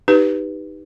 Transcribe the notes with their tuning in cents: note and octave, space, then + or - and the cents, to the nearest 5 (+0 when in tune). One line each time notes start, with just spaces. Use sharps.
D#4 +0 G4 +0 B4 +0